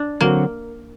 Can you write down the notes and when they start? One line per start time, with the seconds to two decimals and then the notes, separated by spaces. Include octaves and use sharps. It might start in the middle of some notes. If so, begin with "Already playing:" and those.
Already playing: D4
0.20 D3 F#3 A#3 C4 F#4